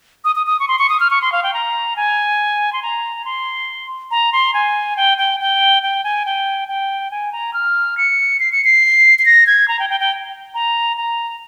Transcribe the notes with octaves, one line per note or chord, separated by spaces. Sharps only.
D#6
D#6
D#6
C#6
C6
C#6
D#6
F6
C#6
C6
F5
G5
A#5
G#5
C6
A#5
C6
A#5
C6
G#5
G5
G5
G5
G5
G#5
G5
G5
G#5
A#5
F6
C#7
C7
C#7
C7
C7
A#6
G#6
A#5
G5
G5
G5
A#5
A#5